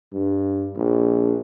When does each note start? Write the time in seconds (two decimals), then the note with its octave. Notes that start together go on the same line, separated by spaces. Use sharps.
0.13 G2
0.77 A#1